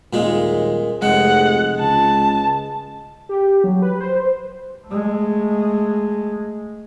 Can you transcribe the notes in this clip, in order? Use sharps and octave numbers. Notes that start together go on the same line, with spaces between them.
D#1 A#2 G#3
F1 G#3 F#5
C#2 A5
G4
F#3
B4
C5
G#3 A3